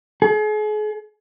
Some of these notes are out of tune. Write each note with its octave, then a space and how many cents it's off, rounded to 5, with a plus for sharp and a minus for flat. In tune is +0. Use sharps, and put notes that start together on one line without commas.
G#4 +40